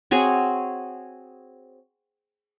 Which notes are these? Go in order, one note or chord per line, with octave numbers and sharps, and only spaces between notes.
C4 F#4 G#4 C#5